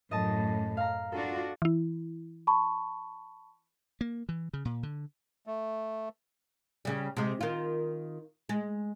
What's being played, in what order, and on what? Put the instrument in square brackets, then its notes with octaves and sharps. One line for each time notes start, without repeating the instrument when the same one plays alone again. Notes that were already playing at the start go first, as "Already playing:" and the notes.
[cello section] F#2 A2 [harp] D#5 A5
[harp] F5 A#5
[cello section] D4 F4 F#4 [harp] A4
[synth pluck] E3 E4
[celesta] A5 B5 C#6
[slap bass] A#3
E3
C#3
A#2
D3
[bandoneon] A3
[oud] C#3 G3
C3 G#3
D#3 F4
G#3